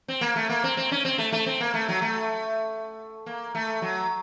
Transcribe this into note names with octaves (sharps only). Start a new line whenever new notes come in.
C4
A#3
A3
A#3
C4
C4
C#4
C4
A3
A3
C4
A#3
A3
F#3
A3
A#3
A3
F#3